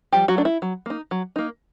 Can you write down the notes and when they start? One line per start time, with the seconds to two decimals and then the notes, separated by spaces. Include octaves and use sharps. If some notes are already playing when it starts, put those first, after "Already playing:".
0.12 F3 G3 G4
0.28 F#3 F#4
0.37 A3 D4
0.45 E4
0.62 F#3
0.86 A#3 D#4
1.11 F#3
1.36 A#3 D#4